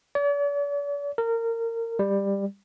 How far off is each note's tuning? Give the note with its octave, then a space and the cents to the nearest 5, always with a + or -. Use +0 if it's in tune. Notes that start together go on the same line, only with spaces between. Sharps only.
D5 -45
A#4 -25
G3 +15